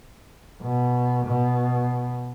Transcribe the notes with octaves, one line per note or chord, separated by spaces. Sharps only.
B2
B2